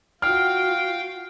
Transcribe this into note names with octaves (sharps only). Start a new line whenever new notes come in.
F4 F#4 F5 G5 F6